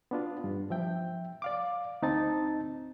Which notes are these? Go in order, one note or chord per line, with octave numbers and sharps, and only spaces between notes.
B3 D4 F4
G2
F3 E5 G5
D5 F5 D6
D2 C4 D#4 A5 A6